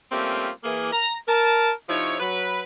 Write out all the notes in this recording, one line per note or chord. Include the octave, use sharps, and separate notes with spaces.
G3 A3 A#3 C4 C#4 F4
E3 A#3 G#4
A#5
A#4 A5
C3 F3 D#4 E4 C#5
F#3 B4